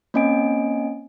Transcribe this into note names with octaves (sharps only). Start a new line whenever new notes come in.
A#3 C4 C#4 D#5 G#5 D7